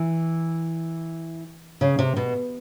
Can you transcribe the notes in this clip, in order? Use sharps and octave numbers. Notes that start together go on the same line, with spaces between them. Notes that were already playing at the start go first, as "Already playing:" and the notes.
Already playing: E3
C#3
C3
B2